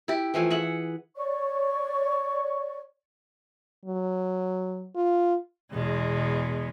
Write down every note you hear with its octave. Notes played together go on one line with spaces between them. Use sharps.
E4 G4
E3 F3 A3 G#5
G#4 E5 F#5
C#5 D5 C#6
F#3
F4
E2 B2 G#3